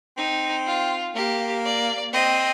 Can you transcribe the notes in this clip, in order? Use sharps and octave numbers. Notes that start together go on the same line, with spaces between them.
C4 D#4
F4
A#3 G4
D5
C4 D#5